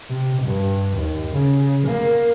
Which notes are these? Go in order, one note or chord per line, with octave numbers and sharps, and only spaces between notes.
C3
G2
D#2
C#3
A#3